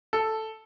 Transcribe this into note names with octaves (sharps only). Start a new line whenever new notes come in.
A4